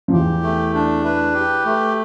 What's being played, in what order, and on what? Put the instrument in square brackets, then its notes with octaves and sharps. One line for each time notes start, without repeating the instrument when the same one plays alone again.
[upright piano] F3
[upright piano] E2 E3 [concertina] G4
[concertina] A3
D4
B4
G4
A3